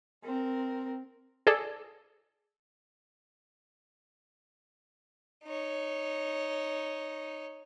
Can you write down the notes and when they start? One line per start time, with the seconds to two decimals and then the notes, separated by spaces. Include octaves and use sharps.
0.23 C4 A#4
1.47 G#4 A4 D5
5.44 D#4 C#5